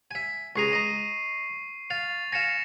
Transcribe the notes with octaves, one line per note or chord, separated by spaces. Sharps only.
E5 G#5
C#2 G#4 A#5 C#6 C7 D#7
D#5 A#5
F5 A6 F7
F5 G#5 A#6 C#7 E7